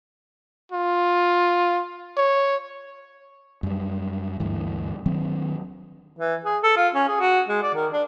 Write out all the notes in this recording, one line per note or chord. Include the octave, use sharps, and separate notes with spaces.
F4
C#5
F#2 G3
D2 G2 E3
D#3 F#3 C4
E3
G#4
A4
F4
C#4
G#4
F#4
G#3
D5
D#3
D4